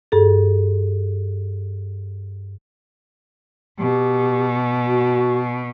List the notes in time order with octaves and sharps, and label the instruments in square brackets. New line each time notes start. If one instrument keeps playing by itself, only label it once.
[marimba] G2 G#4 A4
[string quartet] B2 [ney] G4
[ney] F#4